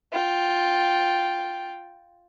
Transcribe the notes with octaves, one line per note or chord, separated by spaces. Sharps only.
F4 G5